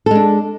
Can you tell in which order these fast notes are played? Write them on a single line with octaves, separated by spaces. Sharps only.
A4 G#3 D4